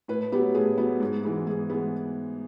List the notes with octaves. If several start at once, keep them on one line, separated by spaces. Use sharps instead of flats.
A2 B4
F#3 B3 G4
A2 G#4
F#3 B3
G#2
E3 G#3 B3
G#2 G#4
E3 G#3 B3